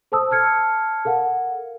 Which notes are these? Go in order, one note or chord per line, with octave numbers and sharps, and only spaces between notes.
A4 C5 A5 D#6 E6
A5 F6 G#6 C#7
A4 A#4 F5 F#5